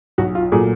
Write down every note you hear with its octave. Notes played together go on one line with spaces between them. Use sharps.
B1 F#4
F4
A#2 F#3 A3 G#4